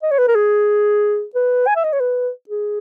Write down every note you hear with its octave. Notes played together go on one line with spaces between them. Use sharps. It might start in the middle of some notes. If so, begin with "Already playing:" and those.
D#5
C#5
B4
A#4
G#4
B4
G#5
E5
D#5
C#5
B4
G#4